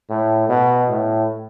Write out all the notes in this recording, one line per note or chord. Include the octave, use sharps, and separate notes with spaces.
A2
B2
A2